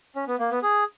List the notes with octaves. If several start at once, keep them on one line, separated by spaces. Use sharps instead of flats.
C#4
B3
A#3
B3
G#4